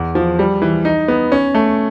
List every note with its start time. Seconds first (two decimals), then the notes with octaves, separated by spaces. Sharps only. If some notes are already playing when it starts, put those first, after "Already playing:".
Already playing: E2
0.15 F3
0.39 G3
0.62 E3
0.85 D#4
1.08 B3
1.32 C#4
1.54 A3